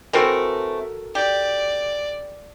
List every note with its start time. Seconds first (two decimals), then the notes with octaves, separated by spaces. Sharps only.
0.13 E3 A3 C4 F#4 A4 A#4
1.15 G4 D5